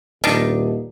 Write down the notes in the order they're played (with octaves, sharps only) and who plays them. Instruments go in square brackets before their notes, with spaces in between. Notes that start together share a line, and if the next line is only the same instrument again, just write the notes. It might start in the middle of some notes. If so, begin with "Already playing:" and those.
[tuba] D#1 [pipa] D4 D#4